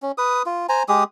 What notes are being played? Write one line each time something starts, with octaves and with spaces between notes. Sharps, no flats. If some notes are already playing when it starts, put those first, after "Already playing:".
C#4
B4 D#6
F4
C5 G#5 A#5
G#3 G4 G#4 D#6